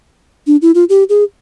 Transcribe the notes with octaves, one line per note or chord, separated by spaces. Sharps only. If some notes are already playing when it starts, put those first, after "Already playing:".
D4
E4
F4
G4
G#4